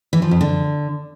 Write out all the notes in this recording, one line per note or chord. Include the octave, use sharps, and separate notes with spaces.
E3
F3
F2
D3